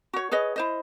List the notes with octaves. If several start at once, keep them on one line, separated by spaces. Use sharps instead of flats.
F#4 C#5
G#4 B4 C#5 D#5
E4 C5 D#5